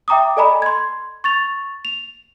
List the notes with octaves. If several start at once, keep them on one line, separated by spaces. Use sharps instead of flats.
E5 G5 A#5 D6 D#6
A4 D5 D#5 G#5 A#5 B5
C6 G#6
C#6 A6 F7
F7